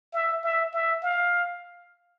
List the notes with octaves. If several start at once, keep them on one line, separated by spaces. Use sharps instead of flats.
E5
E5
E5
F5